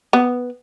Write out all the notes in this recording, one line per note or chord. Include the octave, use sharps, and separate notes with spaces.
B3